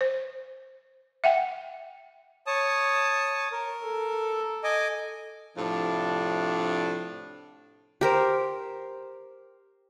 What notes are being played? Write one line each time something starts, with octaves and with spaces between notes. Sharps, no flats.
C5
E5 F#5 G5
C#5 A5 D#6
A#4
A4
D#5 G#5 D6
A2 C3 F3 D4
G4 A#4 C5